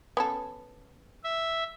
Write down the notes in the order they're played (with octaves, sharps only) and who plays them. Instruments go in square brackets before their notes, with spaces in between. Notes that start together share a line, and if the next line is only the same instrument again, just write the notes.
[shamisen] B3 C#4 A4
[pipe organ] E5